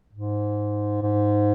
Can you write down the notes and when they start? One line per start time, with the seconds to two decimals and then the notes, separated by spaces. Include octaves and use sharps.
0.13 G#2
1.02 G#2